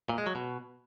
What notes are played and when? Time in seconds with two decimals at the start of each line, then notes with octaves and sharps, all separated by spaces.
0.09 A#2
0.18 G#3
0.26 F#3
0.35 B2